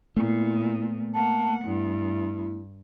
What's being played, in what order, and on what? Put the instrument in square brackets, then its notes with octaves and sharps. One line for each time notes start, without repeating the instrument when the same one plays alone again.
[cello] A#2 [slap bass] A3 B3 [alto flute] E4
[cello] A#3 F#5 [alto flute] A5
[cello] G2 [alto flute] E4